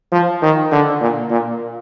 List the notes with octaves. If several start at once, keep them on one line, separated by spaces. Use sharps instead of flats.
F3
D#3
D3
A#2
A#2